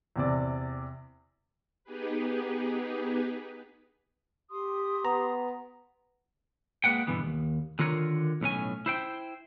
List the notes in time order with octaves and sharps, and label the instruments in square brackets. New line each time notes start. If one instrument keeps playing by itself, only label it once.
[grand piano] E2 C3 D5
[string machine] B3 D#4 G4 G#4 B4
[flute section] G4 C6 D#6
[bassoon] B3 [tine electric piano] A#5
[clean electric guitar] G#3 A#3 B4 F#5 G5
G2 B2 D3 E3 B3
D#2
D3 D#3 F4 A#4 C#5
B1 A2 C#4 G#5
E4 C5 G5